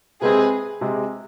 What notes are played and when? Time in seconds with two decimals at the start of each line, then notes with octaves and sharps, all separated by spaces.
0.22 C3 G#3 C4 G#4 B4
0.81 C3 G#3